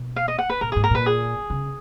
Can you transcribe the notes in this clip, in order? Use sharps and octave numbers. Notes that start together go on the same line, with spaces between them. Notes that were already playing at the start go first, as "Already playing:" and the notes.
Already playing: B2
F5
D#5
F#5
B4
A#2 A#4
G#2 G#4
A#4
A#2 B4
G#4
C#3